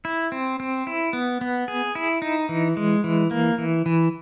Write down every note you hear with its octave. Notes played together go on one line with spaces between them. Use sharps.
E4
C4
C4
E4
B3
B3
G#4
E4
D#4
E3
G#3
E3
A#3
E3
E3